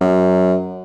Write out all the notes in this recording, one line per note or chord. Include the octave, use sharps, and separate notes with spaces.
F#2